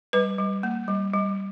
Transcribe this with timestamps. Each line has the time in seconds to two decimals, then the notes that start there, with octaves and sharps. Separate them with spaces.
0.13 G3 B4
0.38 G3
0.63 A#3
0.88 G3
1.14 G3